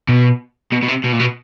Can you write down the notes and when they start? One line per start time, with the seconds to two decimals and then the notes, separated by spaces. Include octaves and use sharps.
0.09 B2
0.72 B2
0.82 B2
0.88 C3
1.04 B2
1.12 A#2
1.19 B2